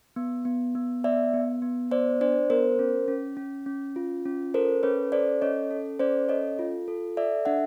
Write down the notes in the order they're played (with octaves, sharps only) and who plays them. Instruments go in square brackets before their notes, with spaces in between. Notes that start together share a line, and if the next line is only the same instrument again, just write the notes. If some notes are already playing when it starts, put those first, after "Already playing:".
[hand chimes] B3
B3
B3
B3 D5 E5
B3
B3
B3 C5 D5
D4 C5 D5
B3 A#4 C5
C#4
C#4
C#4
C#4
F4
C#4
A4 A#4 C5
C#4 B4 C#5
A4 C5 D5
C#4 C#5 D#5
A4
C#4 C5 D5
A4 C#5 D#5
F4
A4
A4 D5 E5
D4 E5 F#5